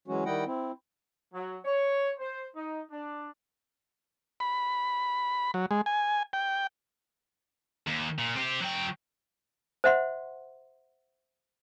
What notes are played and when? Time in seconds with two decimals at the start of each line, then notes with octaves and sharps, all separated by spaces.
0.08 E3 F#3 G#3 C#4 F#4
0.25 D#3 G3 E4 D#5 F#5 G5
0.46 C4 E4
1.34 F#3
1.65 C#5
2.19 C5
2.56 D#4
2.92 D4
4.40 B5
5.54 F#3
5.71 G#3
5.86 G#5
6.33 G5
7.87 D#2
8.19 A#2
8.37 C4 G4
8.61 F#3 G5
9.84 C5 E5 F#5 C6